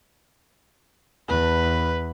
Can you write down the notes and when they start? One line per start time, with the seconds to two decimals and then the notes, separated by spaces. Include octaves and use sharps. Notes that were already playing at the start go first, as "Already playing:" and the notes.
1.29 E2 B4